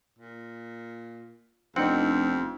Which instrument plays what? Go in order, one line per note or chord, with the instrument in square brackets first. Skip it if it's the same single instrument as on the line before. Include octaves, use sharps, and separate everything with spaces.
[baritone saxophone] A#2
[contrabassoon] F1 [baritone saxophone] F2 [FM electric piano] B3 D4 D#4 [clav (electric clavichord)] C4 F#5